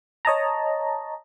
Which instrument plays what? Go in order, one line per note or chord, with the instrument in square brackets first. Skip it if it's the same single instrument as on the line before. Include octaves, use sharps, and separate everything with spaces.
[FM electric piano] C#5 D#5 A5 A#5